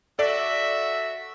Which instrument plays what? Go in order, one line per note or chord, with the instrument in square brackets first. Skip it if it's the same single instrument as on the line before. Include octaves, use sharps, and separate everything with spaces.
[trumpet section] F#4 E5 [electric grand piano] A4 D5